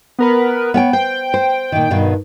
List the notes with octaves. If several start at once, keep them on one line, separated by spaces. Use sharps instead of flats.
B3 A#4 B4
B3 C#5 G5
C5 G5
C5
A#2 D#3
G2 B2 D#3